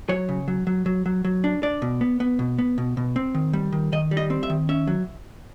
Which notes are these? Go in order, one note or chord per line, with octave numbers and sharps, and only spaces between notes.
F#3 C#5
C#3
F#3
F#3
F#3
F#3
F#3
D4
D4 D5
B2
B3
B3
B2
B3
B2
B2
C4
D#3
G3
D#3
D#3 D#5
G3
D#5
C4
E5
D#3
C#4 E5
F#3